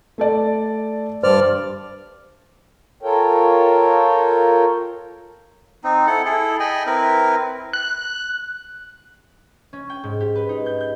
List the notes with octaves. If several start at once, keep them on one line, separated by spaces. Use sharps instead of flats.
A3 A4 D5
G2 C5 D5 F6
F4 A4 A#4 C#5 G5
C4 D#4
E4 A4 F#5
E4 G#4 A4
D#5 G5 G#5 B5
C4 E4 A#4 B4
F#6
C#4
G5
G#2
G4
B4
D#4
G6
G6